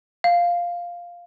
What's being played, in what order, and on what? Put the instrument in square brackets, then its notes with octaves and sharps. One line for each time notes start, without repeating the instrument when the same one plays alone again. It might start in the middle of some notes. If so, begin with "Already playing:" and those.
[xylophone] F5